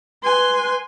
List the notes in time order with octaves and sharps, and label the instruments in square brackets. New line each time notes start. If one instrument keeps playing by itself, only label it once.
[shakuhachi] B4 [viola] G#5 C6